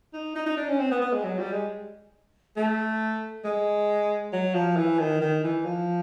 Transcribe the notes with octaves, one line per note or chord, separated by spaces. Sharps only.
D#4
D#4
D#4
D4
C#4
C4
B3
B3
G#3
F#3
G3
G#3
A3
G#3
F#3
F3
E3
D#3
D#3
E3
F3